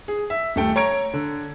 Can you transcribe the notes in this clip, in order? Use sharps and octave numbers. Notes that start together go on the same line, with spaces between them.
G#4
E5
D#1 A3 G5
C#5 A#5 G#6 D7
D3